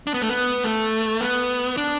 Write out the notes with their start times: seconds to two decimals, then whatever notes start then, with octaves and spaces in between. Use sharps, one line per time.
0.07 D4
0.14 B3
0.22 A3
0.29 B3
0.64 A3
1.21 B3
1.77 D4